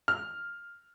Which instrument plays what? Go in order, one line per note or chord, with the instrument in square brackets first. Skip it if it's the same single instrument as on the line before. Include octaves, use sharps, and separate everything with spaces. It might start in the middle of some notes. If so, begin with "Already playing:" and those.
[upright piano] F6